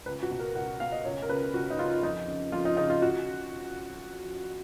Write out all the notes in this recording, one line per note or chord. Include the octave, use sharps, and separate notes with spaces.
C#2 B4
F#4
B2
A#4
C#2 F#5
B2 F5
D#5
C#2 C#5
A#4
C#3 B4
C#2 F#4
D#4
C#3 F4
F2 D#4
C#3
F2 F4
D#4
C#3 D#4
F4
F#4